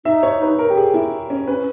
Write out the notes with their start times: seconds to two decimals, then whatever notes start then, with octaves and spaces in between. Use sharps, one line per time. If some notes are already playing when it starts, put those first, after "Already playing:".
0.05 D#4 E5
0.23 C#5
0.42 B4
0.59 A#4
0.70 G4
0.77 G#4
0.94 E4
1.30 C#4
1.47 C#4 B4